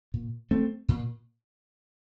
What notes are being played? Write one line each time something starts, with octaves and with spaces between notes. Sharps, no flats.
A#2
A3 C4
A#2